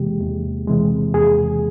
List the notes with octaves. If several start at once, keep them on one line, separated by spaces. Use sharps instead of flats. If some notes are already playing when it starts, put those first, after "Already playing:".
Already playing: E2 C3 E3 G#3 G4
E2
C3 E3 G#3
E2 G#4